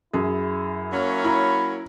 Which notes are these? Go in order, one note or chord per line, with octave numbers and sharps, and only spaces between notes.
F#2 E4 G#4
F#3 A#3 C#4
E4 A#5 B5